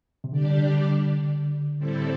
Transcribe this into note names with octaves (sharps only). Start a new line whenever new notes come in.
C3
D3 G3 D4 G4 D5
A2 G3 C4 E4 A4